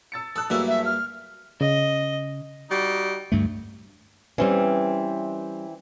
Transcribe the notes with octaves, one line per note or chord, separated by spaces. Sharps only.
E6 A6 C#7
A4 D#6 E6 F#6
G2 F#3 A3 A#3 E4 G#4 E6
E5
F6
C#3 D#5
G3 D#4 F#4
D2 G2 A3
E3 G3 C4 C#4